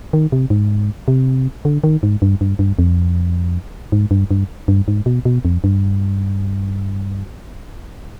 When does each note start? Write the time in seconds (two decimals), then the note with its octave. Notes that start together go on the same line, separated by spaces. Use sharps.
0.13 D#3
0.32 C3
0.50 G#2
1.08 C3
1.65 D3
1.84 D#3
2.03 G#2
2.22 G2
2.41 G2
2.59 G2
2.79 F2
3.92 G#2
4.11 G2
4.31 G2
4.68 G2
4.88 G#2
5.06 B2
5.25 B2
5.45 F2
5.64 G2